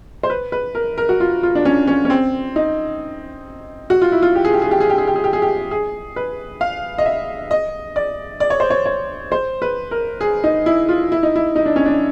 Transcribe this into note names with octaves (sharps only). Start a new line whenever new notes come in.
C5
B4
B4
A#4
A#4
F#4
F4
F4
D4
C#4
C#4
C#4
C4
D#4
F#4
F4
E4
F4
G4
G#4
G4
G#4
G4
G#4
G4
G#4
G4
G#4
G4
G#4
G4
G#4
B4
F5
D#5
E5
D#5
D5
D5
C#5
C5
C#5
C#5
C5
B4
A#4
G#4
D#4
E4
F4
E4
D#4
E4
D#4
D4
C#4
D4